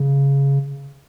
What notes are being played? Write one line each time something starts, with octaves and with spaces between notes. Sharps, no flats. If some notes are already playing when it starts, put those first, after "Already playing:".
Already playing: C#3